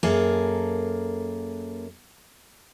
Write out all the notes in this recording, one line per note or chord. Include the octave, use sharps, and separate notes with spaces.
F#2 A#3 G#4 A4